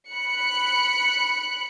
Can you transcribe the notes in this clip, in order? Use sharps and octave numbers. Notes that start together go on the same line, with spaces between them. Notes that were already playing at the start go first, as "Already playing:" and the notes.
B5 F#6 C#7